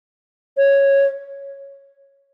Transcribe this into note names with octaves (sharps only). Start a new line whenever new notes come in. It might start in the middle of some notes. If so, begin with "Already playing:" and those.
C#5